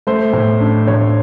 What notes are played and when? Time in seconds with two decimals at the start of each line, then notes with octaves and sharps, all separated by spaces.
0.07 A3 C5
0.33 A2
0.61 D4
0.87 A2 C#5